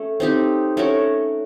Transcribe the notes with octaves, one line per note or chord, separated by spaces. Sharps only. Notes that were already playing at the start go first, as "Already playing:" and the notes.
Already playing: A3 C#4
C4 D#4 G4
A3 C#4 F#4 A#4